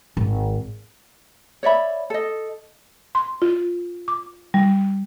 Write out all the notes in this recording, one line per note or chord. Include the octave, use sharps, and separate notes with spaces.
G#1
C#5 D5 E5 B5
A4 D#5
C6
F4
D6
G3